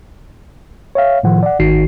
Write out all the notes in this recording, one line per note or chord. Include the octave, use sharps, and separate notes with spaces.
C#5 E5 F5
A2 D#3 F3 F#5
D5 F#5
G#1 D#3 D#4 F#4 C7